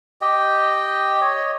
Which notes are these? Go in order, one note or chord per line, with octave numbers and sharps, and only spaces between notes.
G4 D#5 G5
C#5 D#5